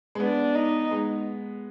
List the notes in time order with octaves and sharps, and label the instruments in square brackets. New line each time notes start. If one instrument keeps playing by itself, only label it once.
[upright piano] G#3
[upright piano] B3 [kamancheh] D4
[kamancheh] D#4
[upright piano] G#3